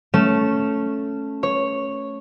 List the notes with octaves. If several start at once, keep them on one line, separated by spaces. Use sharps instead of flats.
A3 C#4 E7
C#5